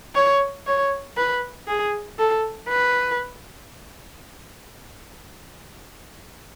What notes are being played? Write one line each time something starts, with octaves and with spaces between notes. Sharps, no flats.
C#5
C#5
B4
G#4
A4
B4